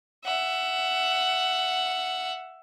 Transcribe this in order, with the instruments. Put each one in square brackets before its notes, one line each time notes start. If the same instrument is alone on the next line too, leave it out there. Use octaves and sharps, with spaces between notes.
[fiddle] E5 F#5